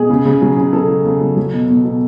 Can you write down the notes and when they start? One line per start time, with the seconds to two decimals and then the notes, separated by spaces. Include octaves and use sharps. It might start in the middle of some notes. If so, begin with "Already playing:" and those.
Already playing: B2 G#4
0.10 C#3
0.25 C#3
0.42 F#3
0.57 C#3
0.73 C#3 A4
0.89 C#3
1.05 C#3
1.21 F#3
1.37 F#3
1.53 B2
1.69 B2
1.85 B2